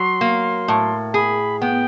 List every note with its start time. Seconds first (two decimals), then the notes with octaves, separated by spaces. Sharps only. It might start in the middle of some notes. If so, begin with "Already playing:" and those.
Already playing: F#3 C6
0.21 A#3
0.68 A2
1.14 G#4 B5
1.61 B3 G5